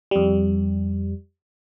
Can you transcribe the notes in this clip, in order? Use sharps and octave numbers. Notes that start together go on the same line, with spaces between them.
F2 G3